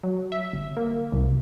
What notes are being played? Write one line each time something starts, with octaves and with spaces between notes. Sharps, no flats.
F#3
E5
G1
A#3
C2